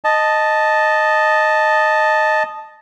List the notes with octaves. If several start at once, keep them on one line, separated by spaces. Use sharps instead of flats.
D#5 A5